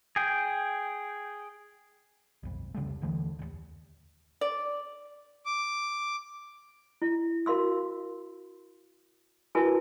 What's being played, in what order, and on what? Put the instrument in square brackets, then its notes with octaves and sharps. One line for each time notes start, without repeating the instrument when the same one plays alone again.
[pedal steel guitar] G#4 G5
[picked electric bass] B1 F2
C2 C#3 G3 A3
D#2 D3 E3 A3
D#1 D#2
[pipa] D5
[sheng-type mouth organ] D6
[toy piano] E4
F#4 A#4 F5 C6 E6
E4 F#4 A#4 B4 G#5 A5